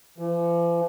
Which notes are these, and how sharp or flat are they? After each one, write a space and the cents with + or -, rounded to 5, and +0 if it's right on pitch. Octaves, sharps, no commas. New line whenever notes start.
F3 -45